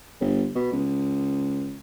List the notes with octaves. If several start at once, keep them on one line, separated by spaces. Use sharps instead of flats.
G1
B2
C#2